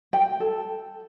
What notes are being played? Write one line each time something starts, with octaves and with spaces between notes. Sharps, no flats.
G5
A4